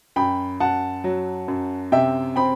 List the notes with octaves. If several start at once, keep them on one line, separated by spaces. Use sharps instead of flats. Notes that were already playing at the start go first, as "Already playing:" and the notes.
F#2 G5 B5
F#2 F#5 A5
F#3
F#2
C3 E5 G5
C4 G5 B5